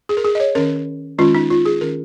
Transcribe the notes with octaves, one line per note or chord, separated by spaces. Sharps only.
G#4
A#4
G#4
D#5
C#5
D#3 C#4 A#4
D#3 G#3 C#4 F4
D#4
F4
G#4
D#3 C#4 A#4